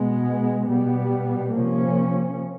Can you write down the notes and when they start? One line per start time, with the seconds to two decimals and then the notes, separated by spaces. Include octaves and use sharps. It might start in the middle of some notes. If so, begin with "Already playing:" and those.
Already playing: B2 G#3 B3
0.69 B2 G3 B3
1.53 C3 F3 A#3 C#4